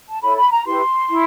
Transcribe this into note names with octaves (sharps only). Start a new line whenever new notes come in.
A5
E4 A4 C#5 B5
B5
A#5
E4 G4 B4 C6
E4